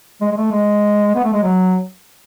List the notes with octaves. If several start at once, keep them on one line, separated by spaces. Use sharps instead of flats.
G#3
G#3
A3
G#3
B3
A3
G#3
F#3